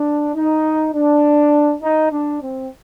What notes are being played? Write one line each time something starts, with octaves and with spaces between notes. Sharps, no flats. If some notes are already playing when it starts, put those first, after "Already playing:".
Already playing: D4
D#4
D4
D#4
D4
C4